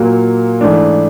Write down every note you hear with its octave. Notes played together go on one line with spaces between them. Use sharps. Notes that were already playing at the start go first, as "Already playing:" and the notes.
Already playing: A#2 F#3 A#3
G#2 E3 A3 D4